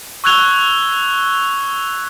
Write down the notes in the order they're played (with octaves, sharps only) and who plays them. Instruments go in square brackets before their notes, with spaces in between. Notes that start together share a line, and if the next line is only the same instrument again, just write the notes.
[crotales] C#6 E6 F#6 G#6 F7 G7